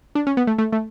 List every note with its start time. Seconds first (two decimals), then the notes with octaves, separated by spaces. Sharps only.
0.15 D4
0.27 C#4
0.37 B3
0.47 A3
0.58 A3
0.72 A3